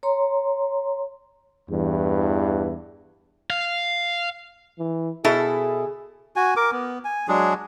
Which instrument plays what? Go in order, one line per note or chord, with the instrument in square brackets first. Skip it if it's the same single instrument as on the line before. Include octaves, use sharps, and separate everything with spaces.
[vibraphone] C#5 A#5 C6
[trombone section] E2 G2 E3
[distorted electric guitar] F5
[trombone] E3
[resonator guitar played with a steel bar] B2 E4 A4 [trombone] G#4
[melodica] F#4 G#5
A#4 D6
B3
G#5
F#3 G#3 D4 G#4